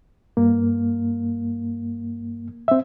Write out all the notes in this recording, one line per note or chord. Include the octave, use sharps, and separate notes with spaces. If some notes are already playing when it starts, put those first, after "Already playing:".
G2 A#3
C4 E5